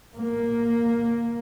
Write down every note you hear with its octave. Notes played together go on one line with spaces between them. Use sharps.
A#3